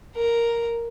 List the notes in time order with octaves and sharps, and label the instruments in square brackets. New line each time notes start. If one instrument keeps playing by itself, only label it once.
[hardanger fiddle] A#4